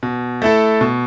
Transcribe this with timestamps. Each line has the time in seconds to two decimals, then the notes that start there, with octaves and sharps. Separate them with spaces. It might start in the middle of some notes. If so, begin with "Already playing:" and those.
0.03 B2
0.42 A3 E4 A4
0.81 B2